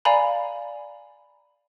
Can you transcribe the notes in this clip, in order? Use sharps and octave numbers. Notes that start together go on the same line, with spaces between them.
D5 F5 G#5 A#5 B5